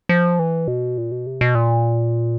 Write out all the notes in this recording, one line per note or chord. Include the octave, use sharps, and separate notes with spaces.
F3
E3
B2
A#2
B2
C3
B2
A#2